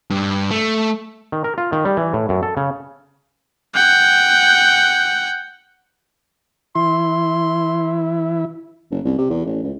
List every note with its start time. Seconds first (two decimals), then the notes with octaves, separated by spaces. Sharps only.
0.10 G2
0.51 A3
1.32 D#3
1.44 A#4
1.58 F4
1.72 D#3
1.85 G3
1.97 E3
2.13 A2
2.29 F#2
2.43 A4
2.57 C#3
3.75 F#5 G5
6.75 E3 E4 C6
8.91 F#1
9.05 C2
9.18 C3
9.30 E2
9.45 A1
9.63 C#2